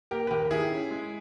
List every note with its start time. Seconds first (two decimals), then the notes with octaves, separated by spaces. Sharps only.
0.11 A#3 G4 A#4
0.27 B4
0.31 D#2 G4 A#4
0.51 D#3 E4 G#4
0.71 C#4
0.91 G#3